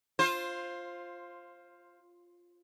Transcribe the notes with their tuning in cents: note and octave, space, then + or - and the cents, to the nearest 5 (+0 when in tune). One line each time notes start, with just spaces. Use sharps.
F4 +0 C5 +15